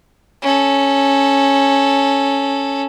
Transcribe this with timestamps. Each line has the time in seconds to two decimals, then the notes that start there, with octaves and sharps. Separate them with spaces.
0.42 C#4 A4